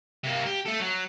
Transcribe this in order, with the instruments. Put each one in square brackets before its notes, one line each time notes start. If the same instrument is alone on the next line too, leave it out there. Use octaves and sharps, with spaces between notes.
[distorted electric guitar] C3 A#3
G4
A3 A4
F#3